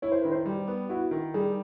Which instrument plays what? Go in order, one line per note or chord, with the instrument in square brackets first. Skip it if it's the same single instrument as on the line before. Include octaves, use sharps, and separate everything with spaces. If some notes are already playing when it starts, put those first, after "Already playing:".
[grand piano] E4 [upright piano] C#5
[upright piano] C5
[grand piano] D#3 [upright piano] B4
[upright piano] C5
[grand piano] G3 [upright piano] G4
[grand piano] B3
[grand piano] E4 [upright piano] F#4
[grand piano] D#3
[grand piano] G3 [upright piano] G#4